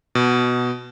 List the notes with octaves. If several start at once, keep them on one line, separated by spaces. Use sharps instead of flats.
B2